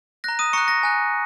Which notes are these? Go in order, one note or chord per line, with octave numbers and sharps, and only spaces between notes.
A#5 F#6 A#6
D#6 D#7
A#5 C#6 F#6 C#7
A#6
G#5 F#6